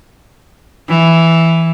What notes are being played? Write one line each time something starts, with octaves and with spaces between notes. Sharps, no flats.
E3